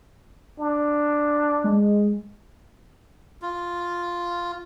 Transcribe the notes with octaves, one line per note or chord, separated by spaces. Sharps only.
D4
G#3
F4